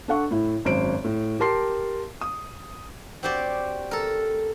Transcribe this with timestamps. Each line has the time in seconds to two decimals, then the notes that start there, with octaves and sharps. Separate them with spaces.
0.08 D4 A4 F#5 C#6
0.31 A2 E4
0.65 G#1 F#2 C5 D7
1.04 A2
1.40 G4 A#4 A5 C6 C7
2.21 D#6
3.23 C4 F#4 G4 C5 D5
3.91 A4 A#4